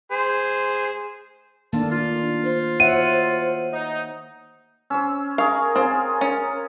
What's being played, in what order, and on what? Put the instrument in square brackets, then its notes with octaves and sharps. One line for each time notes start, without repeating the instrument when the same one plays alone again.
[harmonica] G#4 C5
[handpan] D#3 A3 A#3 [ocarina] D4 [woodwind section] F4 A4 A5
[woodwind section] F4
[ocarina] C5
[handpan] C#5 E5 F#5 [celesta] D#7
[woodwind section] D#4
[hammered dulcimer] C#4 C5 [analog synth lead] E6
[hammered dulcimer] G#4 C#6 [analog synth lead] A#4 [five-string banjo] F5
[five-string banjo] C4 [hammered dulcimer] F4 G#4
[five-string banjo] C#4